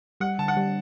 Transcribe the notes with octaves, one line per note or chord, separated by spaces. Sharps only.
G3 F#5
D3 A5
F#5
G3